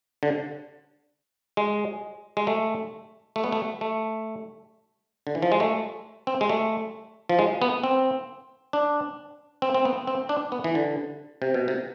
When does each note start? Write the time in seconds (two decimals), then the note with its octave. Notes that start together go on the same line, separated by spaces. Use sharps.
0.23 D3
1.57 G#3
2.37 G#3
2.47 A3
3.36 A3
3.44 B3
3.52 A3
3.81 A3
5.27 D3
5.35 E3
5.42 F3
5.52 G#3
5.60 A3
6.27 C4
6.41 G#3
6.49 A3
7.29 F3
7.39 G#3
7.62 B3
7.84 C4
8.73 D4
9.62 C4
9.74 C4
9.85 B3
10.07 C4
10.29 D4
10.52 B3
10.64 E3
10.75 D3
11.42 C3
11.54 B2
11.68 C3